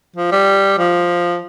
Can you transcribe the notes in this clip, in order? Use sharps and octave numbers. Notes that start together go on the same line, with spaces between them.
F3
G3
F3